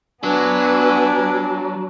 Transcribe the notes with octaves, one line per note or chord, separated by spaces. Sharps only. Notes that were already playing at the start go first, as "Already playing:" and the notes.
F#3 B3 D4 B4 G#5